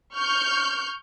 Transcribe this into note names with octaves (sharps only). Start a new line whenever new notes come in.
C#6 F6 G6